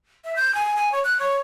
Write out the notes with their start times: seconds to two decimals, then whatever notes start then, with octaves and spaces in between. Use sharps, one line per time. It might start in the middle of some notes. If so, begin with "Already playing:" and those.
0.24 E5
0.36 G6
0.55 G#5
0.76 G#5
0.92 C#5
1.04 F#6
1.20 C#5